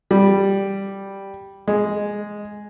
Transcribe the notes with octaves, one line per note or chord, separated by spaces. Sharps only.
G3
G#3